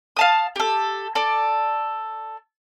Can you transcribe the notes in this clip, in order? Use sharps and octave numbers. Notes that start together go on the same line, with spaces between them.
F5 A5 D#6
G4 A4
A4 D5